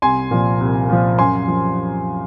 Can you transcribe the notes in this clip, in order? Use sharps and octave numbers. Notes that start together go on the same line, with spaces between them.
C2 G#5 C6
A#2 F3
C2
A#2 F3
F#2 G#5 C6
F3